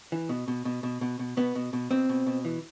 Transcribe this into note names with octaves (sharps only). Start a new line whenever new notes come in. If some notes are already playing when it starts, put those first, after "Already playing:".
E3
B2
B2
B2
B2
B2
B2
B2 B3
B2
B2
B2 C4
B2
B2
E3